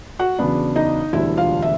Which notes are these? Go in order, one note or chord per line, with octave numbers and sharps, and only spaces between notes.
F#4 F#5
E2 C#3 F#3 B3 D4
D#4 D#5
E1 D2 D3 G3 E4 E5
F4 F5
E5